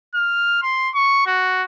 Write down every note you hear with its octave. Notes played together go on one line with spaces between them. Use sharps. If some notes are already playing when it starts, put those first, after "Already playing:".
F6
C6
C#6
F#4